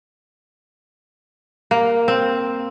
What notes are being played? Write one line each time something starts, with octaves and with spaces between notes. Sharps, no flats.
A#3
C4